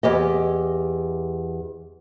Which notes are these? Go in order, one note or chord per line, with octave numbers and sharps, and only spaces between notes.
E2 G4 D#5